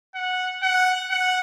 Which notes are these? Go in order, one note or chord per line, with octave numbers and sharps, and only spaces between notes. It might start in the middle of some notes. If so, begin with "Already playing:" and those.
F#5
F#5
F#5